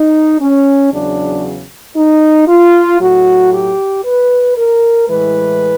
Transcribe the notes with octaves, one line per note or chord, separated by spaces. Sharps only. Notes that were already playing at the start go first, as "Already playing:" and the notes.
Already playing: D#4
C#4
E2 C#3 F#3 D4
D#4
F4
A2 F#3 F#4
G4
B4
A#4
A2 E3 G#3 B4